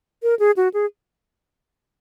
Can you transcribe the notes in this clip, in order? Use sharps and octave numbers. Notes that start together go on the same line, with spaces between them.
A#4
G#4
F#4
G#4